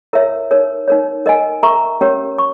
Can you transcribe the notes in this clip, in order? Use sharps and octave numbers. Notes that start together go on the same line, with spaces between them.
E4 A#4 C#5 E5
D#4 A#4 C#5
D#4 A#4 C#5
A#4 D#5 G#5
A#4 E5 A#5 C#6
C#4 G4 A#4 C#5
C#6